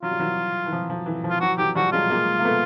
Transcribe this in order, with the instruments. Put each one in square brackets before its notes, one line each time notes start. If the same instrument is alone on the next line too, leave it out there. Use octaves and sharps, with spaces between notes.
[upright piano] F#3 [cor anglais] F4
[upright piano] G3
E3 F#3
E3
F3
F3
E3
F3
[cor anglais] F4
[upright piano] E3 F#3 [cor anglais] F#4
[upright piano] E3 F#3 [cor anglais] G4
[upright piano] F3 G3 [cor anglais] F#4
[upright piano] F#3 G#3 [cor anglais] F4
[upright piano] G#3 A#3
A#3
A3 B3